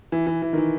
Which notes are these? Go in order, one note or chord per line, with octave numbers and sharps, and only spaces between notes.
E3
E3
E3
D#3
E3